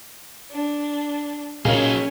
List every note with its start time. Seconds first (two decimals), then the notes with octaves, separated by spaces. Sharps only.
0.51 D4
1.65 A#2 F#3 C#4 D#4 G#4